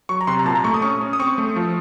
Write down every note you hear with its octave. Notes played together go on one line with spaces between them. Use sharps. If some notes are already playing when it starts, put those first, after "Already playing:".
F#3 C#6
A#5
C3 C6
A#5
A#2 A5
A#5
A3 C#6
D#6
C#4 C#6
C#4
D#6
C4 C#6
A3
F3